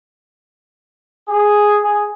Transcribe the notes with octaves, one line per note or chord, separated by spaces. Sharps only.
G#4
G#4